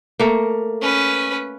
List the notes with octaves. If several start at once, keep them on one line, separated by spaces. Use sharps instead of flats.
A3 A#3
C#4 B4